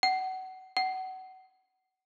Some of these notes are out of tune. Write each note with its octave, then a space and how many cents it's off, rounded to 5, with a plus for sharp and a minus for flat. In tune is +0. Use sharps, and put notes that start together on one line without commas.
F#5 +25
F#5 +25